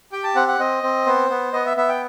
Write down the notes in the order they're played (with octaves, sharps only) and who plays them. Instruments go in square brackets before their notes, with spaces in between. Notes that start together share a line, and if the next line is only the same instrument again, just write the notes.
[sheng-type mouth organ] G4 G5
A5
C4 F#5
F#5
C4 D#5
C4
B3 C5
B3
B3 D#5
E5
B3 E5
G5